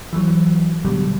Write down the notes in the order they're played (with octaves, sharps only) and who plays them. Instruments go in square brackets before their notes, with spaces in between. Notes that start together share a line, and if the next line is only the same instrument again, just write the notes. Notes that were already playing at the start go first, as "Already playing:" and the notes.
[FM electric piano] E3 F#3
B2 D3 F#3 G3